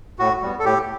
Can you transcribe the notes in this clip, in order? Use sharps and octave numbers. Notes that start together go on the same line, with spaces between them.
A2 F#4
G3 B3
A4
A2 G4